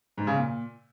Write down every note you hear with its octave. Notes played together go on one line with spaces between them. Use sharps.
G#2
C#3
A#2